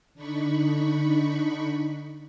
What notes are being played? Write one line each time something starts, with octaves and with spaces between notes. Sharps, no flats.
D3 D4 D#4 B5 C#6